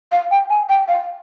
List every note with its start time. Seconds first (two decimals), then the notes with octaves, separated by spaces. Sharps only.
0.12 F5
0.31 G5
0.50 G#5
0.69 G5
0.88 F5